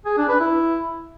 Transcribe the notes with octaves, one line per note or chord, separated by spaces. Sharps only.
G#4
D4
B4
E4